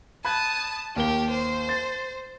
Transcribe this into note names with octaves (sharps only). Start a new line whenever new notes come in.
A5 B5 D#6 F#6 G#6
D#2 G4 A#4 G7
C5
A6